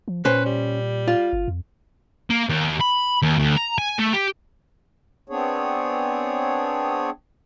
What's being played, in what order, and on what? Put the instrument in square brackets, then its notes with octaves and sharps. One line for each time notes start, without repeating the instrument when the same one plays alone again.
[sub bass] F3
[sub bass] A#2 [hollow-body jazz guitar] C#4 C5 [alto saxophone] B4
[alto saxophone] G3
[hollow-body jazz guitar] F4
[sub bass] G1
F2
[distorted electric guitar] A#3
D#2
B5
D#2
D2
A#5
G#5
A3
G4
[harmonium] B3 C4 D4 G#4 C#5